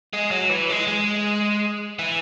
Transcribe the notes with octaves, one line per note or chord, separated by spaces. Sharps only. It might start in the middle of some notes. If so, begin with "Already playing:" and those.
G#3
F#3
E3
G#3
G#3
E3